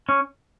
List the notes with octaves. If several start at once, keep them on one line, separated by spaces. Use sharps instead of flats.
C#4